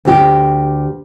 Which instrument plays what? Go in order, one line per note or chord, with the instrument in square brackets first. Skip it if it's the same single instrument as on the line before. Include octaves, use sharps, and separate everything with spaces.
[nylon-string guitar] D2 G4